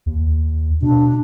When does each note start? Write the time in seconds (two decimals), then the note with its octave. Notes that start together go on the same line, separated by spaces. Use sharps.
0.06 D#2
0.82 B2 D4